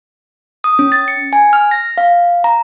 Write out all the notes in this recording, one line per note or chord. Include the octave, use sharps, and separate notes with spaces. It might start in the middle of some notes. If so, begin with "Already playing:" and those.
D#6
C#4
A6
C#7
G#5
F6
A#6
F5
A#5